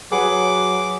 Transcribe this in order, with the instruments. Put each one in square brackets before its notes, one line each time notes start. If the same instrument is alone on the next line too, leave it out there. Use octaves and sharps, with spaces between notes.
[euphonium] F#3 [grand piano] G#4 B4 F#5 [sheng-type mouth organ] D6